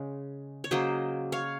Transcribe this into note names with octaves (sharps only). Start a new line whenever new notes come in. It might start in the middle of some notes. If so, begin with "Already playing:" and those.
Already playing: C#3 G#3
C#5
C#3 F#3 A#3 C5 D#5
C#5 F5